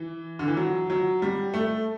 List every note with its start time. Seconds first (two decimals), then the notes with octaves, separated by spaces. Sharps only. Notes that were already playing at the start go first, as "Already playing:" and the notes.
Already playing: E3
0.39 D3
0.48 E3
0.57 F#3
0.90 F#3
1.22 G3
1.54 A3